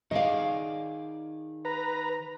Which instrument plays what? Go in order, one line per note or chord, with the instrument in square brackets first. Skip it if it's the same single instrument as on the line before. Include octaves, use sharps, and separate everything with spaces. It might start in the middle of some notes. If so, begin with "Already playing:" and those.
[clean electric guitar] D#3 G#4 D5 [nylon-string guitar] D#5 F5
[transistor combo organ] B4 A#5